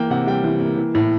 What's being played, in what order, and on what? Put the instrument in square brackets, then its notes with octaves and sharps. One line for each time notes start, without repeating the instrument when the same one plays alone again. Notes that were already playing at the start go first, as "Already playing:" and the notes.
Already playing: [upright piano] E3 A#3 G5
C3 F#5
G3 G5
E3
A#3
E3
A2